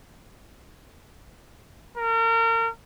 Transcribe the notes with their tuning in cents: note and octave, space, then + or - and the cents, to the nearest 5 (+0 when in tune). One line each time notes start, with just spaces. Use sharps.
A#4 -35